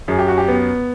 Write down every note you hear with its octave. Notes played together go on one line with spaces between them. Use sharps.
F#2 G#4
G4
F#4
G4
B3